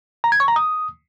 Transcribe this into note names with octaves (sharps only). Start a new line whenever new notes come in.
A#5
G#6
C#6
A#5
D#6